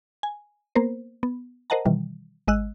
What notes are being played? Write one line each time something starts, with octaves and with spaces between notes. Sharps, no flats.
G#5
A#3 B3 A#4 C5
B3
A#4 C5 D#5 F#5 A5 A#5
B2 D#3 E3 G3
G#1 G#3 D#5 E6 F#6